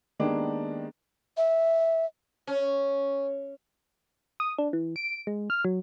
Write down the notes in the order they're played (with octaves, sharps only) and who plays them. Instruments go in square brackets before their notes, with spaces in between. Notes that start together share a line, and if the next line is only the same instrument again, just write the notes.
[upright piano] D#3 G#3 A#3 B3 D4 G4
[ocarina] E5
[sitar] C#4
[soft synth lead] D#6
D4
E3
D7
G#3
F6
F#3